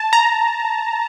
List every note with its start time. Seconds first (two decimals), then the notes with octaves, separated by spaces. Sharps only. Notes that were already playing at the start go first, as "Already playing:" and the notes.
Already playing: A5
0.13 A#5